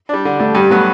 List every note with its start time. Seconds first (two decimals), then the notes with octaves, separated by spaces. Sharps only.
0.09 G3 D4
0.25 D3
0.40 G3 A3 D4
0.55 G2 G3
0.71 F#3 A3 B3 F#4